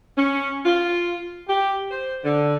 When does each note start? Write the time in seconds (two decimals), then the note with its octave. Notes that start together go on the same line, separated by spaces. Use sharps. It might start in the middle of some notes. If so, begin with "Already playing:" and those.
0.17 C#4
0.64 F4
1.48 G4
1.90 C5
2.24 D3